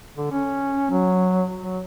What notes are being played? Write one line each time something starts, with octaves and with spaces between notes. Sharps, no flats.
D3
C#4
F#3
F#3